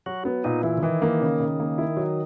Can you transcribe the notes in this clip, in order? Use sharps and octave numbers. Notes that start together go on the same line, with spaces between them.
F#3 F#4
B3
A#2 D#4
E3 E4
C#3
D#3 E3
A#3
C#3
C#3
A#3
E4
F#3